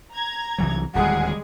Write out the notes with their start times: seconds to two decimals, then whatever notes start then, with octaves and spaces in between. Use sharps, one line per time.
0.14 A#5 G#6
0.58 C2 E3 F#3
0.95 D1 D#2 G3 G#3 G#4 F#5